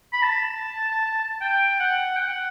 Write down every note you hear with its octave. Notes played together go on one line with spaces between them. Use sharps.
B5
A5
G5
F#5
G5
F#5